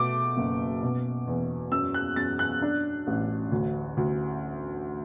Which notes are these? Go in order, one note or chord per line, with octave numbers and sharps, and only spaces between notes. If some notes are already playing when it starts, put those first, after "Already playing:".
Already playing: B2 A3 D6
F#1
B2
E2
F#2 E6
F#6
F#2 A6
F#6
D4
A1
D2
D2